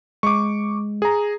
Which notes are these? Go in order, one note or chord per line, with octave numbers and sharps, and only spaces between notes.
G#3 C#6 D6
G#4 A#5